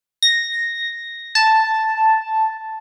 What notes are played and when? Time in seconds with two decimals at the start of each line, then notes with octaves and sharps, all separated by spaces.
0.22 A#6
1.35 A5